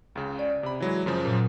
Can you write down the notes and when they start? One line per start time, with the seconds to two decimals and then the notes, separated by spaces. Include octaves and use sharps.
0.15 C#2 C#3
0.39 D5
0.63 C3 B5
0.80 E3 F#3 G#3
1.06 F#2 C#3 F3
1.25 A#2 F#3